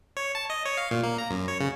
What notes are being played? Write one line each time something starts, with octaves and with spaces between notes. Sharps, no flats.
C#5
A5
D#5
C#5
F5
A#2
A#3
A#5
F#2
C#5
C#3